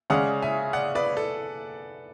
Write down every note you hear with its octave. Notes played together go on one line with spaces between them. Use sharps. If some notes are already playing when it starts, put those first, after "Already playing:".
C#3 G#3 C#4 G#4 D5 F#5
E5 G#5
D5 F#5
B4 D5
A4